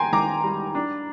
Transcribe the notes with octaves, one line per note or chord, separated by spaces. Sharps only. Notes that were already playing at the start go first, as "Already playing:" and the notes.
Already playing: D#3 A#3 G5 G#5 A#5 C6
D#3 A#5 D6
G3
D4